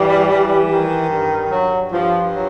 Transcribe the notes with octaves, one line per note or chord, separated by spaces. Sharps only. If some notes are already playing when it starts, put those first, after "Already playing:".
Already playing: G2 E3 G3
E3
D#3
G2
G2 F#3
G2 F3
F#3